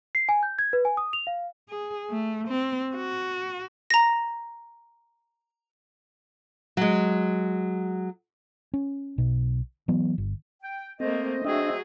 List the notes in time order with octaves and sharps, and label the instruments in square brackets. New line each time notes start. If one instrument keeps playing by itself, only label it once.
[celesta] C7
G#5
G6
G#6
B4
G#5
D#6
F7
F5
[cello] G#4
A3
C4
F#4
[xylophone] A#5 A#6
[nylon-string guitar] F#3 G#3
[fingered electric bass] C#4
B1 B2
E3 F#3 B3
G1
[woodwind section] G5
[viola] A3 A#3 [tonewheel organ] C4 [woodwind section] C5 D#5
[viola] F#3 G#4 [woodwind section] A3 C4 [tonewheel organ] D4 E5 [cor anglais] D#5